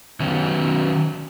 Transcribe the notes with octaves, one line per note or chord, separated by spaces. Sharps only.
D#3 F#3 B3 C#4